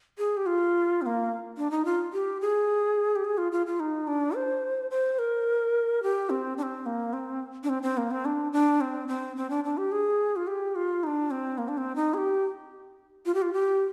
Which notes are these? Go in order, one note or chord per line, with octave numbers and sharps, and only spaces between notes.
G#4
G4
F4
C4
A#3
D4
D#4
F4
G4
G#4
G4
G#4
F4
F4
F4
D#4
D4
C5
C5
A#4
G4
C4
D4
C4
A#3
C4
D4
C4
C4
A#3
C4
D4
D4
C4
C4
C4
D4
D4
G4
G#4
F4
G4
F4
D#4
D4
C4
A#3
D4
C4
D#4
G#4
G4
F4
G4
F4
G4